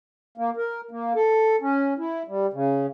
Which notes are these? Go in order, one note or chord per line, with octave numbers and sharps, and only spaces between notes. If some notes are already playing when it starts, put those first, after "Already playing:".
A#3
A#4
A#3
A4
C#4
E4
G3
C#3